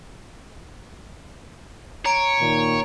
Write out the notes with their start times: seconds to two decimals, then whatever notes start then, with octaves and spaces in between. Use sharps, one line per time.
2.06 C#5 A#5 D7
2.40 A#2 D#3